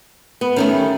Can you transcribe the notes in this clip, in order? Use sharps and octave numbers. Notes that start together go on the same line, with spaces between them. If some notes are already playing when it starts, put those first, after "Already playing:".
B3
D#3 G3 A3 C#4